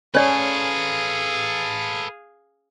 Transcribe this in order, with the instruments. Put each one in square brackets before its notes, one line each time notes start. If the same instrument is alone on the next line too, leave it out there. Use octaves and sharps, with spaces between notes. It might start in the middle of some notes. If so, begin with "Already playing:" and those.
[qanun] C#4 [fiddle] G#4 F5 [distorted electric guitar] A4 B4 [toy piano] C#5 D5